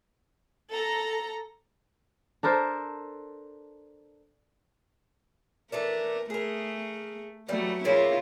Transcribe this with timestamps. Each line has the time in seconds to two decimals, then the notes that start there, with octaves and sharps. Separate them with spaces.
0.73 A4 A#5
2.43 D4 A4 A#4 C5
5.72 E3 A3 D4 A#4
6.30 A3 G#4 A#4
7.48 E3 F#3 G3 A3
7.85 A#2 C#3 A#3 E4 F4